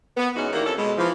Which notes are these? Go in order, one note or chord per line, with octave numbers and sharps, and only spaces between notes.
B3
G#2 E3 C#4 D#4 F#4
D#3 G3 A#3 E4 F#4
F2 C#4 A4
B2 G#3
E3 F3